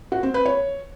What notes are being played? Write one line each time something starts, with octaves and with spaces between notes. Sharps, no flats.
F#4
C4
B4
C#5